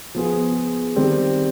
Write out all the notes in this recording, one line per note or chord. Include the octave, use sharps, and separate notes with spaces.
F3 B3 F4 G#4
D#3 G3 C4